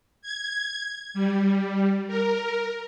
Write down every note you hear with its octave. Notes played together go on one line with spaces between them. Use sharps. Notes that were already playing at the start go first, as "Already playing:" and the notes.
G#6
G3
A#4